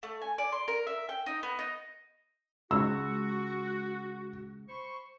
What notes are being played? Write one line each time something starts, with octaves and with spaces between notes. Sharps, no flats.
A3
G#5
D5
C6
A#4
E5
G5
D#4
B3
D#4
C#2 F#4 E6
C5 B5 C#6